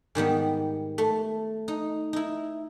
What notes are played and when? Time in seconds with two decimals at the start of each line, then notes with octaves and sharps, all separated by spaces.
0.15 G#2 D#3 G3 B3
0.98 A3
1.68 D#4
2.13 D#4 E4